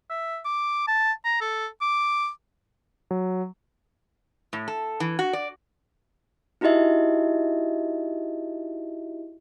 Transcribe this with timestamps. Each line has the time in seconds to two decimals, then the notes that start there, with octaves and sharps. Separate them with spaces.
0.10 E5
0.45 D6
0.88 A5
1.25 A#5
1.41 A4
1.81 D6
3.11 F#3
4.53 A2
4.68 A4
5.00 E3
5.19 F#4
5.33 D5
6.61 D#4 E4 F#4 G4 D#5 E5